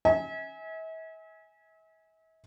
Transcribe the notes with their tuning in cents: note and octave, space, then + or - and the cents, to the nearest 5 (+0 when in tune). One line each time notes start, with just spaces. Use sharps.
E5 -40 G#5 +0